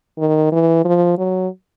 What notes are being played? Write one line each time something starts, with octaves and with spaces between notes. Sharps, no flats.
D#3
E3
F3
F#3